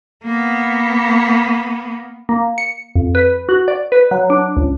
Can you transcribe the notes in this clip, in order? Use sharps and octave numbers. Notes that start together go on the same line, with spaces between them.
A#3 B3
A#3
C#7
F2
B4
F#4
D5
B4
F#3
D4
C#2